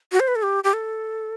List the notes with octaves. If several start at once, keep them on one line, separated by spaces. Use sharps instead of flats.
F#4
C5
B4
A4
G4
G4
A4